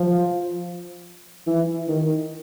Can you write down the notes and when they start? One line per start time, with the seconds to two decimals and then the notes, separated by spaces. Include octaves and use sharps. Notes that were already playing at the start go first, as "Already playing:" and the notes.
Already playing: F3
1.46 E3
1.88 D#3